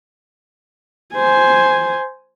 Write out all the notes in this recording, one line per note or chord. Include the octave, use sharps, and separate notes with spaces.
C5 G#5